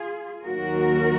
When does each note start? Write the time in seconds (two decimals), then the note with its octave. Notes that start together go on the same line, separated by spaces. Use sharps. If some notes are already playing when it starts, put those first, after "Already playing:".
Already playing: F4 G#4
0.44 D#2 D#3 F#3 F#4 A#4